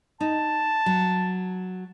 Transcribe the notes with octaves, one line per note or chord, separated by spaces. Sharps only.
D#4 A5
F#3